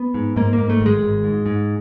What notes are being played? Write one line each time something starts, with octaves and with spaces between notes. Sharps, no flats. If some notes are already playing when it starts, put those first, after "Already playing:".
Already playing: B3
G#2
G#2 A#3
A#3
G#2
A3
G#1
G#3
G#1
G#2
G#2